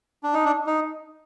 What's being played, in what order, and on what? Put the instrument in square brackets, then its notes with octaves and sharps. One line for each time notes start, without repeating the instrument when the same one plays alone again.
[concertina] D4
D#4
D4
D#4